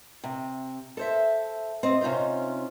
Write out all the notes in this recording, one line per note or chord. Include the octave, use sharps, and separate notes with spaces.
C3
A4 C5 E5
C4 D#5
C3 C#4 D#4 F4 C5